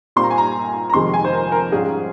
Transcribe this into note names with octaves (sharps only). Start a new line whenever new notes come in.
A#2 G3 C4 F4 C6
A#5
G#5
A#5
A#5
F1 F2 C3 D#3 G#3 C6
G#5
C5
A#4
A#4
G#2 G3 C#4 F4 G#4